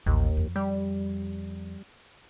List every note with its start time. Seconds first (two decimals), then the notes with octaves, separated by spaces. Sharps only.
0.06 A1 D#2
0.37 F2
0.56 G3